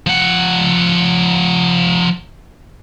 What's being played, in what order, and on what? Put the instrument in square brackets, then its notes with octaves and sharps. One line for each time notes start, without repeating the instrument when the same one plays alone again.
[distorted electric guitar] F3 F#5